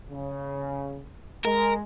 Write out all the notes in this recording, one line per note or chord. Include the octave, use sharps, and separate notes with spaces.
C#3
G#3 A#4